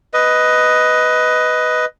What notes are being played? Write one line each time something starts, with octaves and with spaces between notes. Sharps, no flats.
B4 D#5